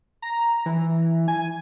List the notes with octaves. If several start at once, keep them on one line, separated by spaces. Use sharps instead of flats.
A#5
E3
G#5